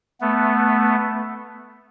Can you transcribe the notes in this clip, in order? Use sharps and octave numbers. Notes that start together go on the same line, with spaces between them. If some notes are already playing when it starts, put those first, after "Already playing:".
A3 B3